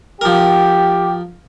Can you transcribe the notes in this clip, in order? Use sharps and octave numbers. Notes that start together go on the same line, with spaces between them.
F3 G4 A#4